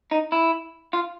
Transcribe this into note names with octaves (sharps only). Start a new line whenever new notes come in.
D#4
E4
F4